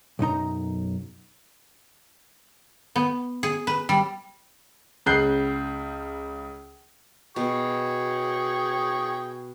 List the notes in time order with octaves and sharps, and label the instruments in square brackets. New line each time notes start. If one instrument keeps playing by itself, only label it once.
[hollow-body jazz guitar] B1 F#2 D#4 A#5
[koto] B3
G#4
B4
G3
[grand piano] C#2 C#3 F#6 G6 C7
[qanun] B2 [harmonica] G#4 G5 C#6